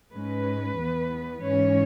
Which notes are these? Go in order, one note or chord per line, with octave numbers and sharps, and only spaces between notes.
G#2 G#3 C#4 B4
E2 E3 B3
G#2 E3 C#4 C#5